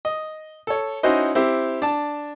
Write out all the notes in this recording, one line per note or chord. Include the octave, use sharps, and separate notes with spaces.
D#5
A4 C#5
C#4 D#4 E4 F#4 C5 D#5
C4 E4 G4
D4 A5